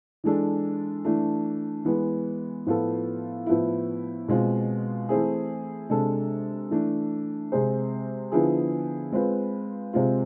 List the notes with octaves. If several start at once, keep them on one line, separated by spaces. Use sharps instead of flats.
E3 G#3 D4 A4
E3 A3 D4
E3 G#3 B3
A2 F3 B3 F4 A4
A2 F3 B3 E4
B2 G#3 C4 F4
E3 A3 C4 E4 G#4
C3 G#3 D4 A4
E3 A3 D4
C3 G#3 C4 G#4 C5
D3 F3 B3 E4 G#4
G#3 C4 F4 B4
C3 G#3 C4 F4